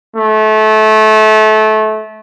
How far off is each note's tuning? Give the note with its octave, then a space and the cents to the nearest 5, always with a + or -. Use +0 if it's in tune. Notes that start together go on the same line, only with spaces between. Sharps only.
A3 -25